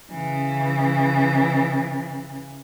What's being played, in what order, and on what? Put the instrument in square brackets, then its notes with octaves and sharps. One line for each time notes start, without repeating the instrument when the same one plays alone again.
[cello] C#3 E3